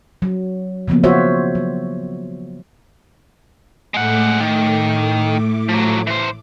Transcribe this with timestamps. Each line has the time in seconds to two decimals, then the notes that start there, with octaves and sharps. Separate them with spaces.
0.22 F#3
0.88 C#3 F3 A#3 B3
1.04 F4 F#4 C5 C#5 E5
1.55 F#3
3.94 A2 G#3 A3 F#5 D6
4.40 D#3
5.69 F3 F#3
6.07 E3 C5